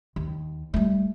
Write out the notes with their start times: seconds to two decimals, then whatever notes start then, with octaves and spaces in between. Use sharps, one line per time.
0.16 D#2
0.74 G3 A3